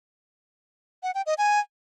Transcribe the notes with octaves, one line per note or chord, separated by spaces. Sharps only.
F#5
G5
D#5
G#5